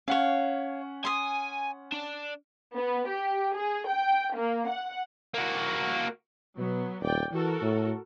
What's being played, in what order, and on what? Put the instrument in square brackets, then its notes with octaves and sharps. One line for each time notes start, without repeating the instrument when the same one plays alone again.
[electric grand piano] C#4 F#5 [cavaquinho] C#5 F5
[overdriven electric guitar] G#5 [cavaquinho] C6 D#6
[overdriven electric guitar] D4 D5
[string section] B3
G4
G#4
G5
A#3
F#5
[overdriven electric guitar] A#3 F#4
[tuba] B2 [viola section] F#3 B3
[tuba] D#1 [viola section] D5 G5
[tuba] E3 [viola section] F#4 A4 A#4
[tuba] A2